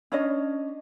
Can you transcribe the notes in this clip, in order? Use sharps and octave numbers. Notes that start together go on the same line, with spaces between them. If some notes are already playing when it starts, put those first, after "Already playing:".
C#4 D4 C#5 D#5